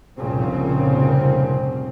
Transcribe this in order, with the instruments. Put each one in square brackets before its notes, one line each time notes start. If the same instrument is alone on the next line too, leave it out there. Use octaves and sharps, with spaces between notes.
[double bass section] F1 C2 A#2 C#3 C4